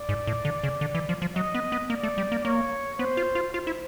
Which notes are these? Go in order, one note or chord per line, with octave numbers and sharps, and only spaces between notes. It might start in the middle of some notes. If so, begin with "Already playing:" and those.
Already playing: D5
G#2
A2
D3
C#3
D3
E3
F3
F3
F#3 D#5
B3
B3
A#3 D5
A3
G3
A#3
A#3 C#5
B3 C5
F4
F4
F4 C5
E4